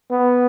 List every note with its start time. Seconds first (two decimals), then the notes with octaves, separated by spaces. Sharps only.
0.11 B3